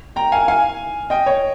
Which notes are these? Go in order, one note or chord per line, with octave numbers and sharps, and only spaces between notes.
G5 A#5
F5 G#5
F5 G#5
D#5 G5
C#5